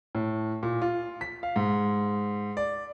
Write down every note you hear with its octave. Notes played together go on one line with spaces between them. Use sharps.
A2
A#2
F4
B6
F5
G#2
D5